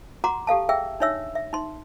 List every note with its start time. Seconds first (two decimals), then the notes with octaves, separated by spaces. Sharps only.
0.24 F#4 F#5 A#5 C6 D6
0.47 G4 A4 F5 A5
0.69 G#4 E5 G5 E6
1.00 D4 D#4 C#5 E5 E6
1.35 E5
1.53 D#4 C6